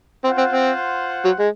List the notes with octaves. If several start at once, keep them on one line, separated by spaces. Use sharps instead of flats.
C4 F4 C5 F#5
C4
C4
F#3
G#3